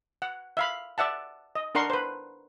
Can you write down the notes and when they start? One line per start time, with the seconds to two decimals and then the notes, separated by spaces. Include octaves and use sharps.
0.22 F#5
0.57 E5 F5 B5
0.98 D5 E5 F#5 A5
1.55 D#5
1.75 D4 A#4 F#5 C6 C#6
1.90 B4 C5